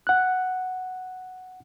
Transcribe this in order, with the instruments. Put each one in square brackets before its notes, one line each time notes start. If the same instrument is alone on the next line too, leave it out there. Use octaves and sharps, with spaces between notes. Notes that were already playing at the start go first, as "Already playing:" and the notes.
[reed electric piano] F#5 F#6